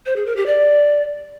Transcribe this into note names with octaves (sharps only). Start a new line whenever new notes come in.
C5
G#4
A#4
G4
D5